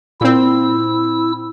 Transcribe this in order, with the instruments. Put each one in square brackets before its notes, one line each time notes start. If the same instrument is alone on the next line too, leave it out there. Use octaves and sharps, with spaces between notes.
[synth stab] A#2 C4 [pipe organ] E4 E6